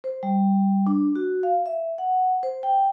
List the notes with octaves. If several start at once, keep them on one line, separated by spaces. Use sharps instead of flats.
C5
G3
D4
F#4
F5
E5
F#5
C5
G5